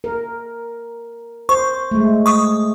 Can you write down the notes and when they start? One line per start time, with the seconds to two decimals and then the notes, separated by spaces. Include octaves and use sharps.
0.04 A#4
1.49 C5 C#6
1.91 G#3 A3
2.26 C#6 D#6